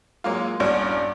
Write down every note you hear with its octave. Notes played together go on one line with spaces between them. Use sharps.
F#3 G#3 A#3 F4
A#1 E2 G2 C#4 F#4